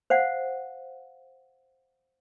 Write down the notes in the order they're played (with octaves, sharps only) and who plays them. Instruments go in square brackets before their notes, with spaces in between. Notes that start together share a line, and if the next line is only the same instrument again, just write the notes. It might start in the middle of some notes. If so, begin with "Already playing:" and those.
[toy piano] C5 F5 F#5